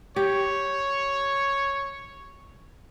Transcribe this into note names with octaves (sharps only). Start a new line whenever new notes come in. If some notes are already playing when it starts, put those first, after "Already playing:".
G4 C#5